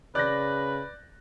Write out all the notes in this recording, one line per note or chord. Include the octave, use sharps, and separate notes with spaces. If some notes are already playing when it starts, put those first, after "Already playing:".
C#3 B4 D5 F#6 G6 A#6